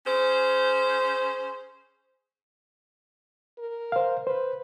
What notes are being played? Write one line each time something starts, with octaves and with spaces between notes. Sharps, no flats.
C#4 G#4 C5
A#4
C5 F5
B4 C5